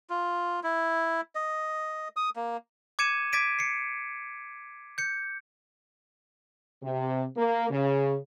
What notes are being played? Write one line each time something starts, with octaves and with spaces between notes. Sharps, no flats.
F4
E4
D#5
D#6
A#3
D6 G#6 C#7 D#7 E7
D6 G#6 A6 B6 D7 D#7
C7 C#7
G6 C#7
C3
A#3
C#3